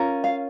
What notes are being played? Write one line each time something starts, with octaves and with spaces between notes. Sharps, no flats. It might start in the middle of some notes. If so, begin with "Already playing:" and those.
Already playing: C#4 F4 A#4
F5